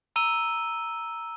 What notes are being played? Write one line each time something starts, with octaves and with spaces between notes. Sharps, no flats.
A#5 E6 D#7 G7